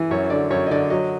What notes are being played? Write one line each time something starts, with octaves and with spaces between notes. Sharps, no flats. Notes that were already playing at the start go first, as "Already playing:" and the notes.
Already playing: E3
F#2 C#5
D3 D5
F#2 C#5
D#5
D3 D5
F#3 D#5